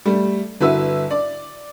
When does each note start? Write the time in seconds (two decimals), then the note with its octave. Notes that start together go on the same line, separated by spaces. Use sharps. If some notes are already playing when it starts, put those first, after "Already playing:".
0.05 G3 A3
0.61 G1 E4 F#4 B4 E5 E6
1.11 D5